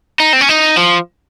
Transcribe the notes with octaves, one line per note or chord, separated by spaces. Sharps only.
D#4
C4
C#4
D#4
F3